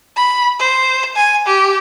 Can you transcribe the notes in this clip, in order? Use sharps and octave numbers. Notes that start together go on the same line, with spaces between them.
B5
C5
G#5
G4